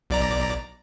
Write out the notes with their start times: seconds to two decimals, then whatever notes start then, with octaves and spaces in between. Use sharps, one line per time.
0.10 B1 D5 A#5